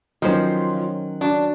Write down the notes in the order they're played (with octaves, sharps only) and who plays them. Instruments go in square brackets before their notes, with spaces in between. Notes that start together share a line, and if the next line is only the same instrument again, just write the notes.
[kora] D#3 [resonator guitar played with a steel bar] F3 [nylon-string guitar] F#3 C#4 C5
[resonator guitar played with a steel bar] D4 [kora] F#4